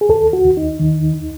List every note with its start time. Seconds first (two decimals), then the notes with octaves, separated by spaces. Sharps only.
0.01 G#4
0.09 D#2 A4
0.33 F#4
0.46 D#2
0.57 D#4
0.80 D#3